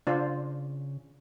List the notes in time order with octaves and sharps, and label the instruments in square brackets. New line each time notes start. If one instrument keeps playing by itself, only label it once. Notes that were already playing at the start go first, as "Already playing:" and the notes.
[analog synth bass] C#3 [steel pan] D4 F4 C5